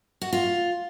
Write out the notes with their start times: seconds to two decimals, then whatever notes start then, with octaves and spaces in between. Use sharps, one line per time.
0.22 F#4
0.33 F4